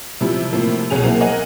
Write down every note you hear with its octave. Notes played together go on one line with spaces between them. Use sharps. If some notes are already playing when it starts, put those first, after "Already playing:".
C3 E3 F3 G3
A2 C3 F3 A#3
C2 B2 C#4 G#4 G#5 F7
F#3 A#3 C4 E4
A#4 D#5 F#5 G#5